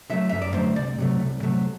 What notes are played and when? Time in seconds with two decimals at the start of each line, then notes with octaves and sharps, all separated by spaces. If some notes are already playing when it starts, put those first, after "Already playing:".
0.10 D3 F#3 A3 E5
0.29 F#2 E5
0.42 D5
0.54 D3 F#3 A3 C5
0.76 C2 D5
0.98 C3 F#3 A3
1.20 C2
1.42 C3 F#3 A3